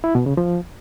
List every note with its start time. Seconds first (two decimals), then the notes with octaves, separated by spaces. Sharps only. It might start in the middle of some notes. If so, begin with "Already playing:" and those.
0.04 E4
0.15 B2
0.26 C#3
0.37 F3